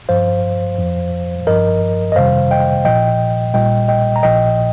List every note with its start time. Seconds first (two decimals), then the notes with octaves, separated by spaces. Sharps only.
0.09 G1 G2 F3 C5 F5
0.78 F2 F3
1.47 G1 G2 F3 A#4 D#5
2.12 D#5
2.16 G1 F2 C3 D#3 G3 C5 F5
2.51 D#5 G5
2.85 A#1 A#2 F3 D#5 G5
3.54 A#1 A#2 G3 D#5 G5
3.88 D#5 G5
4.16 A#5
4.23 A#1 A#2 F3 D#5 G5